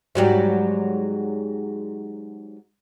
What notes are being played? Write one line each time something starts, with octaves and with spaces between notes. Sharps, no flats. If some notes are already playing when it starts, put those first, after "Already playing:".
G#2 F#3 G3